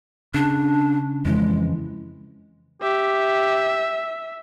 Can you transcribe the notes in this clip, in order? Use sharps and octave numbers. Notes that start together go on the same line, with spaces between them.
C#3 D4
F2 C#3 E3 G#3
G4 E5